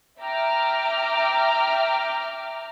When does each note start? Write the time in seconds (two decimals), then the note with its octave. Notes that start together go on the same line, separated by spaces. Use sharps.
0.21 E5 G5 A#5 D6 F6